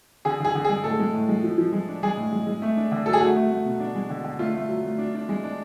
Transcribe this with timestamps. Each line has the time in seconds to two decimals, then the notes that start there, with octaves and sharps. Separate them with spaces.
0.25 D3 G#4
0.40 D3 G#4
0.55 D3
0.65 G#3 G#4
0.84 A2 A4
0.99 G#3
1.14 A2
1.29 G#3
1.44 F3
1.58 F3
1.73 G#3
1.88 D4
2.03 G#3 G#4
2.17 A2
2.32 G#3
2.47 G#3
2.62 A3
2.77 D4
2.91 D3
3.06 F#3 A4
3.13 G#4
3.21 A3 F#4
3.36 A3
3.50 A3
3.65 B2
3.80 D4
3.95 G#3
4.10 D3
4.24 D3
4.39 A3 F4
4.55 A3
4.69 F#3
4.84 A3
4.98 D4
5.14 D4
5.29 G#3
5.44 D4